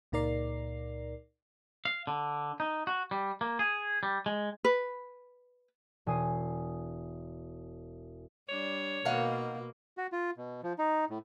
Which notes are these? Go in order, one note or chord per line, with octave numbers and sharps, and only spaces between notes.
C#2 A#2 D#4 A#4 D5 C7
F5
D3
D#4
F#4
G3
A#3
G#4
G3
G#3
B4
E1 G#5 D#6 C7 D#7
G3 D4 C#5
B2 D#3 A#3 F5 F#5
F#4
F4
B2
F3
D#4
A2